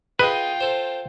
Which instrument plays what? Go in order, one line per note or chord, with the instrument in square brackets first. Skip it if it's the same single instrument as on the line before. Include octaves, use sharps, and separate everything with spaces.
[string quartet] F4 G5 [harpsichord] G#4 D#5 [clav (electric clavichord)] B4
[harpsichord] A4 C5